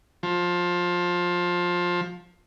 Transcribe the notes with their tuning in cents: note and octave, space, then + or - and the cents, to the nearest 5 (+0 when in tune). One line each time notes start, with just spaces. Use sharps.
F3 +15